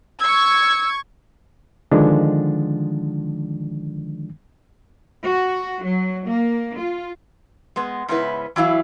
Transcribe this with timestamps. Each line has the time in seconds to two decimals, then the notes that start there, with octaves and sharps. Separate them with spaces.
0.20 C#6 E6 G#6
1.91 D3 D#3 F3 G#3 D4
5.24 F#4
5.83 F#3
6.26 A#3
6.77 F4
7.76 G#3 B3
8.08 G#2 C#3 B3 C#4 E4 B4
8.56 E3 F#3 E4 F5